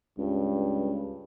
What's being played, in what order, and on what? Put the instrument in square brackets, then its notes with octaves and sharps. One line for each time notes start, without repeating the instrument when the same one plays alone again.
[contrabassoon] C#2 [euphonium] G2